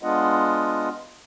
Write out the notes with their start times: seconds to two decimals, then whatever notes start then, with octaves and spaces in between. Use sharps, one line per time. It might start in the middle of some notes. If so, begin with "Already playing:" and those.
0.03 G#3 B3 D4 F4 D#5 F#5